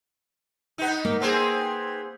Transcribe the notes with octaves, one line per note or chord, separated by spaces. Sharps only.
B3 D#4
A#3
B3 C4 G#4